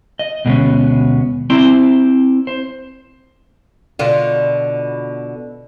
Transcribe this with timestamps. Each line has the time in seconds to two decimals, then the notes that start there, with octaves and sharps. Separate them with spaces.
0.19 D#5
0.45 D2 B2 G#3 A#3 B3 C#4
1.50 C4 E4 C5 D5 A#5 C6
2.47 C5
3.99 B2 D3 F4